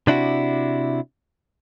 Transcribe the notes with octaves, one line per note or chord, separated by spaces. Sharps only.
C3 D4 E4 F#4